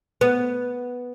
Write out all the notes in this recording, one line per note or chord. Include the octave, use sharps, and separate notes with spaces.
B3